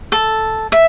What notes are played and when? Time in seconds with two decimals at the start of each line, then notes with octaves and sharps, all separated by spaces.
0.12 A4
0.72 E5